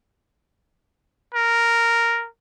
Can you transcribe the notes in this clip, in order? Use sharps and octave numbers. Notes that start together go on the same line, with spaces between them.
A#4